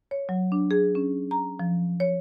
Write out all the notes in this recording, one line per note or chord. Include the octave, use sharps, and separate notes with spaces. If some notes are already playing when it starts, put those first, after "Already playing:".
C#5
F#3
D4
G#4
C#4
A#5
F3
C#5